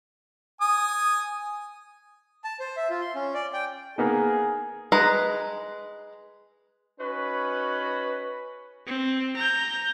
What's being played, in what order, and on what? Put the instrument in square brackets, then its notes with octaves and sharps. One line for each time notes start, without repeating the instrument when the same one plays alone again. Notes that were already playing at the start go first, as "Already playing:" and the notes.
[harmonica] G#5 D#6
[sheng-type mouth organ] A5
C5
E5
F4
C6
C#4
D5
G5
[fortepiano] A#3 B3 D#4 [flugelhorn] G#4
[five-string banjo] G#3 B4 A#5
[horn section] C#4 D#4 F#4 B4 B5
[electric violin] C4
A#5 G6